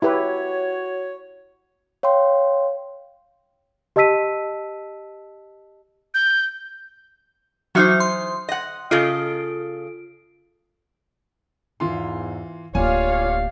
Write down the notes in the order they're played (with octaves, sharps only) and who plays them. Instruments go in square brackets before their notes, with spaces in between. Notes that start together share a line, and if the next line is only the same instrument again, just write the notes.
[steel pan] E4 G4 B4 [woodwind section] F#4 C#5
[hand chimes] C#5 F5 G5 C6
[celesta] G4 D#5 A5 E6 B6 D#7
[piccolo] G6
[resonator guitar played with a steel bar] E3 D#4 C5 [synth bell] F#3 F#4 F6
[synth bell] C6
[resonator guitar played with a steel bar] D#5 F#5
[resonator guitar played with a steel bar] C#3 A4 D#5 [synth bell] F4 D7
[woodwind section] E2 G#2 [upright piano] E3 F4 C6
[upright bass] D1 A#3 [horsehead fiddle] F4 C#5 [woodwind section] G4 D5 F5 [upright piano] G#5